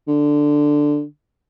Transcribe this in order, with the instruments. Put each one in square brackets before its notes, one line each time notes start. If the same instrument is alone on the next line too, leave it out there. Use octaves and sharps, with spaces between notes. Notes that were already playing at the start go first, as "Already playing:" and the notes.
[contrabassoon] D3